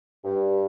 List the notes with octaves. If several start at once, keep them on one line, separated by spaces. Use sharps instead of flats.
G2